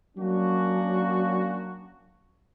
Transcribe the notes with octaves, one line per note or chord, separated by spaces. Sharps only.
F#3 A#3 C#4 D4 F#4